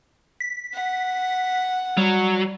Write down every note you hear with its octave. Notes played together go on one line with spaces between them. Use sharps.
B6
F#5
F#3 G3